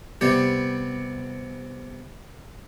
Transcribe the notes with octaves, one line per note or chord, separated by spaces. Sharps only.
C3 G3 B3 G4